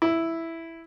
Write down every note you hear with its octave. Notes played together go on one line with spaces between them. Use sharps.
E4